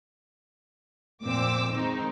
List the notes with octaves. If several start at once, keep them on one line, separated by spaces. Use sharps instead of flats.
F2 A#2 C4 D6 E6
D#3 G#3 C4 D#4